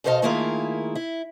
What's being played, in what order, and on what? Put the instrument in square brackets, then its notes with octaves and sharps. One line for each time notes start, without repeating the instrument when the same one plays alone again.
[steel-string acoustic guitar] E2 B2 A4 C5 D#5 F5
D#3 A3 A#3 E4 F4 G#4
E4